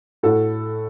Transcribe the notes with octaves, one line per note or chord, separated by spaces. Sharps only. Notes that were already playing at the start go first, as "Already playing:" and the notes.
A2 F#4 A4